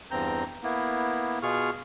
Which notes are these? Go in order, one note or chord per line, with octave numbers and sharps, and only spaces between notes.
E2 G2 C4 A#5 G6
A#3 B3 E4
B2 F4 G#4 C#6 F6